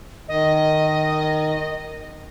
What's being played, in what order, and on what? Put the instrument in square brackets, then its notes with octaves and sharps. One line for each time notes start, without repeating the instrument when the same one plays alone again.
[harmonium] D#3 [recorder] D#5